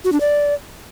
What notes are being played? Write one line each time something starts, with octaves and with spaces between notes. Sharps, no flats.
F#4
D4
D5